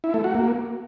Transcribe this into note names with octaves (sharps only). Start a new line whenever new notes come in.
E4
A3
F#4
A#3